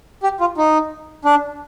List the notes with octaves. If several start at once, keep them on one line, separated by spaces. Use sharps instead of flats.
G4
F4
D#4
D4